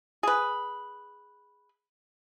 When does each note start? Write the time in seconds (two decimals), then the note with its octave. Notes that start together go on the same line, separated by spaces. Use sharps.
0.23 G#4 B4